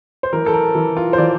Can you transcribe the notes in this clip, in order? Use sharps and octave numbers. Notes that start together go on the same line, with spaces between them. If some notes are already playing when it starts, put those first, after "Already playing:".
C5
E3 A#4
A4
A#4
E3
F4
C5
E3 D5